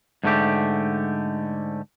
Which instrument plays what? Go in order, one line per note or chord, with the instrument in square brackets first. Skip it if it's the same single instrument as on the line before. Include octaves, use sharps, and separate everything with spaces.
[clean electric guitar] G#2 D3 A3 G4